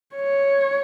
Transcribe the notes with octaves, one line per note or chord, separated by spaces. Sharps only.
C#5